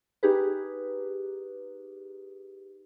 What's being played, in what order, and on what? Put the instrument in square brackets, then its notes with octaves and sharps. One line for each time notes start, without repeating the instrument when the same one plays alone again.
[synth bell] D#4 G4 G#4 B4